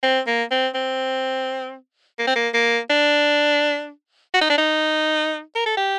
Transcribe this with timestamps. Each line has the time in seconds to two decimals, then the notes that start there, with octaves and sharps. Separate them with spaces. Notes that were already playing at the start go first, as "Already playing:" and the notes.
0.03 C4
0.27 A#3
0.51 C4
0.75 C4
2.19 A#3
2.27 C4
2.36 A#3
2.54 A#3
2.90 D4
4.34 F#4
4.42 D#4
4.50 D4
4.58 D#4
5.56 A#4
5.66 A4
5.77 G4